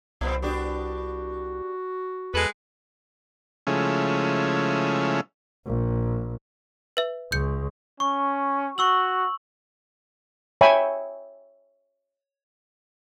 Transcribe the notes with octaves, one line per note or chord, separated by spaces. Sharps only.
C2 A#2 B3 C4
B3 D4 F#4 G4
E2 G#3 A4 B4
C#3 F3 G#3 A3 C#4 E4
A#1
B4 E5
C#2 G6 C#7
C#4 C#6
F#4 C#6 E6 F#7
C#5 E5 G5 G#5 B5